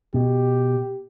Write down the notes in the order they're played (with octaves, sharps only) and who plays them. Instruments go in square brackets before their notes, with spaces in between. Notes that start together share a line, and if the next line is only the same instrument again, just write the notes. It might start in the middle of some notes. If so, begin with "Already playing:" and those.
[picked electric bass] B2 [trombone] G4